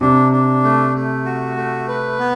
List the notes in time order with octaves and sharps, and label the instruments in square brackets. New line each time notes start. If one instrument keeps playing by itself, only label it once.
[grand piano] C3 [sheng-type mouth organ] D4
[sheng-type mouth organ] D4
A3
A3
F#4
A3
B4
B3